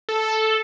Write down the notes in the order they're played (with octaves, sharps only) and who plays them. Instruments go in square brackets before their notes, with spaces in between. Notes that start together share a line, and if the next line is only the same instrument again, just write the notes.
[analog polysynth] A4